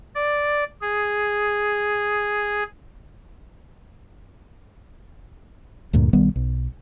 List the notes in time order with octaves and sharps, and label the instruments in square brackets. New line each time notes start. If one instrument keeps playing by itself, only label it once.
[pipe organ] D5
G#4
[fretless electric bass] D2 G2 A#2
B1 D#3 G3 B3
B1